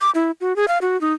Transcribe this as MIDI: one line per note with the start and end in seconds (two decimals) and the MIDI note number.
0.01 0.11 86
0.15 0.31 64
0.41 0.55 66
0.56 0.68 68
0.68 0.78 77
0.81 0.99 66
1.01 1.13 63